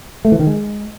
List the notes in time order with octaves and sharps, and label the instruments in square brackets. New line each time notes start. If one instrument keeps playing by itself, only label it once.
[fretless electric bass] A3
E3
D#3
G#3